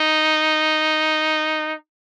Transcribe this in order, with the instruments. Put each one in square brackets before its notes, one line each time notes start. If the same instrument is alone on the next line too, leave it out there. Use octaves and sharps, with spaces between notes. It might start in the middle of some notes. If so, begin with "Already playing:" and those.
Already playing: [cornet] D#4